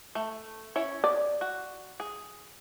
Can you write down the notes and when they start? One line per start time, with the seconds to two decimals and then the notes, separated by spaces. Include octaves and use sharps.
0.15 A3
0.76 C#4 E4 C#5
1.04 D5
1.41 F#4
2.00 G#4